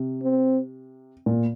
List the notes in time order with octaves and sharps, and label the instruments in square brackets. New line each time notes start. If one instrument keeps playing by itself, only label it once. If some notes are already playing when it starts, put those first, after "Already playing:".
Already playing: [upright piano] C3
[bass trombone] C4
[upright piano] A#2